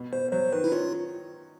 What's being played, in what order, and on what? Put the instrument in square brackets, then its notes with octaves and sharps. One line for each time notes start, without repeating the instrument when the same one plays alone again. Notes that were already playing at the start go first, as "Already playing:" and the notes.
Already playing: [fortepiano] B2
[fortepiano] B2 [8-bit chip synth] C5
[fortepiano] F#3 [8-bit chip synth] C5
[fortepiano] D#3 [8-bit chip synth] B4
[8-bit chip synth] E4
[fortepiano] C#4 [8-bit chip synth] F4